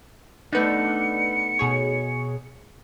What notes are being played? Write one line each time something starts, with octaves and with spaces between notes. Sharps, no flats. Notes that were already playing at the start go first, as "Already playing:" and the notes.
A3 B3 D4 D#4 B4 C#7
B2 G#4 C#5